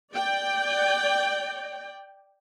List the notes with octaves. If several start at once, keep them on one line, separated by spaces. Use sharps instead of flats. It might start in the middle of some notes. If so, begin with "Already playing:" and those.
D5 G5